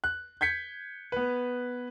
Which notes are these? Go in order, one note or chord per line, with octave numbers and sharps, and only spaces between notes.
F#6
G6 G#6 B6 C#7
B3 B4